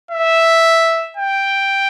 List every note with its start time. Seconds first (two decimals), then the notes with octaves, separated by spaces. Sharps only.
0.11 E5
1.17 G5